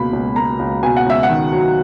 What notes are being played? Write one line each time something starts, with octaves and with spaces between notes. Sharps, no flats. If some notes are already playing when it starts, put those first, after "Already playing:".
Already playing: C#2 B2 A#3 B5
C#2
A#3 A#5
C#2
B2 G#5
F#5
C#2 E5
F#5
D#3
F#3